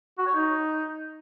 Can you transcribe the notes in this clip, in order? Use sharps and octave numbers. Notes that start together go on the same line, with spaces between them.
F#4
C#5
D#4